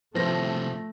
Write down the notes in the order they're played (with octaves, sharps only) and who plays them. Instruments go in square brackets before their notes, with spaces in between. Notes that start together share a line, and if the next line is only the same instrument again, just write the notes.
[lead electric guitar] A2 C3 [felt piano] F3 A#6 [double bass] A3